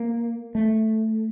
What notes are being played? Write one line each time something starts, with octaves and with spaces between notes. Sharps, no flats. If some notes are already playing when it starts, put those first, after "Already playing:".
Already playing: A#3
A3